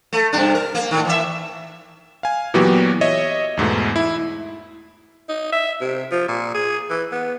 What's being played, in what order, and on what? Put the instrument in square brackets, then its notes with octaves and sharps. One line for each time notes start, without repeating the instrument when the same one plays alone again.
[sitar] A3
G2 C3 D4
A#4
A#3
A2 D#3
E3 E5
[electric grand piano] F5 G#5
A#2 E3 F#3 B3 F#4 G4
C#5 D#5 E5
E2 G#2 B2 A3
E4 E5
[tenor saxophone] D#4
E5
C3
F3
A#2
G#4
E3
B3